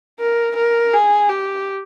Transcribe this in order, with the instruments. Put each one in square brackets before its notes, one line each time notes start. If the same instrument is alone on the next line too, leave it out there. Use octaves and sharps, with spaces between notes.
[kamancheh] A#4
A#4
G#4
G4